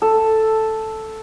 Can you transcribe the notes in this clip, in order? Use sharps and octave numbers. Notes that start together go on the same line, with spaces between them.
A4